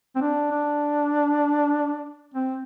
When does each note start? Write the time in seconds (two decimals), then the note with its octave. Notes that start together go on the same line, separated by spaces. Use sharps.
0.16 C4
0.21 D4
0.51 D4
2.34 C4